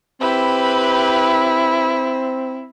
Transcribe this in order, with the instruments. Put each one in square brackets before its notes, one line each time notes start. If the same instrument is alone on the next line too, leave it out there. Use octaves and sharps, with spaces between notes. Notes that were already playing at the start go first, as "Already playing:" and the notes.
[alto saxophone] C4 [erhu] E4 [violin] G4 B4